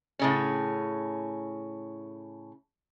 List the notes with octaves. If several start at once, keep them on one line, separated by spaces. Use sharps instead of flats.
A2 C#3 C#4